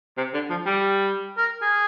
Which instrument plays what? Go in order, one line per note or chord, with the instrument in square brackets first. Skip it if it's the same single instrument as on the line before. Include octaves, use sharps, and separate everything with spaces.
[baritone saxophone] C3
D3
F3
G3
[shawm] A#4
G#4